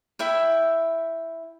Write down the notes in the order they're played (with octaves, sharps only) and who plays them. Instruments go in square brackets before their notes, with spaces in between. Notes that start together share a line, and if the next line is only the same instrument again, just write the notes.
[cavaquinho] E4 E5 G5